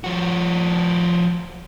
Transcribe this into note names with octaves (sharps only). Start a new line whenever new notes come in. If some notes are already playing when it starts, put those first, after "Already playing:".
F3 F#4